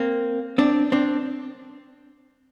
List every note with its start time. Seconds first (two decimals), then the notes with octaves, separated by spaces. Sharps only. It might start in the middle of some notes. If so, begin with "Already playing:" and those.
Already playing: A#3 C4
0.58 C4 D4
0.92 C4 D4